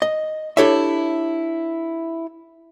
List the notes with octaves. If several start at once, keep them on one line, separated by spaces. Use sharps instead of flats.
D#5
D4 E4 G4 A4 C#5 E5